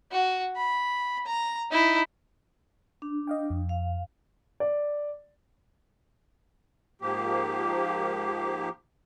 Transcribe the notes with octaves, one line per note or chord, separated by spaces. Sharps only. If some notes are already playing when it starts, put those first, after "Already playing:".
F#4
B5
A#5
D#4 E4
D4
D#5 F5 G5
F2
F5
D5
G#2 F3 A#3 G4